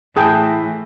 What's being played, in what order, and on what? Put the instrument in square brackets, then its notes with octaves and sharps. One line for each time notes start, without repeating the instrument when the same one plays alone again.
[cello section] A2 [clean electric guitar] E3 [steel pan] G#4 G5 [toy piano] A5 D#6